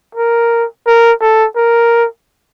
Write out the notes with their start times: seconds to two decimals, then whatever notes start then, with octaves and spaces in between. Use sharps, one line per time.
0.15 A#4
0.87 A#4
1.21 A4
1.56 A#4